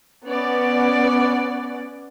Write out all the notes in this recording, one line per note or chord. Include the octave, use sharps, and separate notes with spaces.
B3 C#4 D5